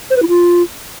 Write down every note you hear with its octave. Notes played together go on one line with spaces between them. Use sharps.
C5
B4
E4
F4